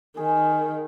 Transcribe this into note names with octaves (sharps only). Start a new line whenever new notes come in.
D#3 G#4